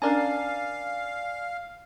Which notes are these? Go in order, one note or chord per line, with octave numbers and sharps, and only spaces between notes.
C#4 D4 A#4 D5 F5 G#5